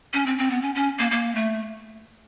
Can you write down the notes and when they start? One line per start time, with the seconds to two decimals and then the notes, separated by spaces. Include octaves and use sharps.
0.13 C#4
0.26 C4
0.38 C4
0.50 B3
0.62 C#4
0.75 C#4
0.99 A#3
1.11 A#3
1.35 A3